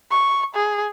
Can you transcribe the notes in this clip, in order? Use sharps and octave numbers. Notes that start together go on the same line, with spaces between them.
C#6
G#4